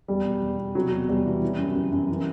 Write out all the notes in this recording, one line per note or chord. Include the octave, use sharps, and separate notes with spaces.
E2 G3
B2
E2
B2
C3 F#3
E2
E2 G3
E3
E3
F#2
F#2
F#2
E3